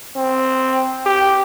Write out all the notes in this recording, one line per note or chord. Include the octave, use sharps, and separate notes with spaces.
C4
G4